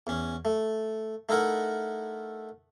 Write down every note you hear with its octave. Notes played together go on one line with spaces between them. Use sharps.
E2 C#4
A3
A3 D#4 E4 A#4 F#5